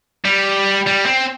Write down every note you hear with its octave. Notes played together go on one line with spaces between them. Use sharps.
G3
G3
C4